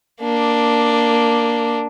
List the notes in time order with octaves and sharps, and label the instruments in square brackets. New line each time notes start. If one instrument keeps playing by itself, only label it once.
[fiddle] A#3 D4